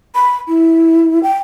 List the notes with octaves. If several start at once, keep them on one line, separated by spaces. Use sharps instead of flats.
B5
E4
G5